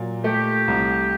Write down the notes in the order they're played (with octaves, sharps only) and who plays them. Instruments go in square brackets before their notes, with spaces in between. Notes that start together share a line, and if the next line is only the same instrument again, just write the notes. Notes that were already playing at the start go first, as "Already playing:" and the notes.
Already playing: [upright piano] A#2 F#3
[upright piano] A3 [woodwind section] G4
[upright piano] C2